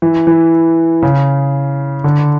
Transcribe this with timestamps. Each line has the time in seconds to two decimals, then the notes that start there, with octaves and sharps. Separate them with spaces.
0.02 E3
0.27 E3
1.02 C#3
2.04 D3